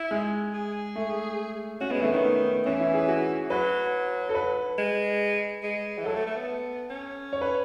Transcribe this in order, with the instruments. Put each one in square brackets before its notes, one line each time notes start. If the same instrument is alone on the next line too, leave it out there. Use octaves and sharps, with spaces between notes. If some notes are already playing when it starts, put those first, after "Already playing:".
Already playing: [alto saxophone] E4
[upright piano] G#3
[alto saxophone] G#4
[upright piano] A3
[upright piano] C#4 [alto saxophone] F#4
[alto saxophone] G#3 [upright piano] B3
[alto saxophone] E3 [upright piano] A3
[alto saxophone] D#3 [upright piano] B3
[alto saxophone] E3 [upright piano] C#4
[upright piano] E4
G#4
F#4
[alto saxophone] F#3 [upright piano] B4
[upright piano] A4
B4
[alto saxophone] G#3
G#3
E3
[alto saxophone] F#3 [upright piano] A4
[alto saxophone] A3
A3
B3
C#4
[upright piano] C#5
B4